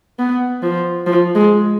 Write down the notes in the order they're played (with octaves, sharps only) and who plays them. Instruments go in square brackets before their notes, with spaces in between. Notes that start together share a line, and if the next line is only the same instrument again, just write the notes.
[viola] B3
F3
F3
G#3